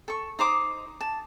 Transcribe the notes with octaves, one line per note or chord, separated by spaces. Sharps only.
A4 C#6
D#4 C5 D6 D#6
A5